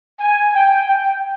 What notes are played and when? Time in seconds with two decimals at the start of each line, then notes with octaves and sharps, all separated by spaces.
0.19 G#5
0.54 G5
0.89 G5